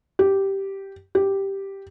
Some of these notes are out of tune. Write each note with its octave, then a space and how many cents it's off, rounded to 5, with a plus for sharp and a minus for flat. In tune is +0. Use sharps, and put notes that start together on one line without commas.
G4 -5
G4 +0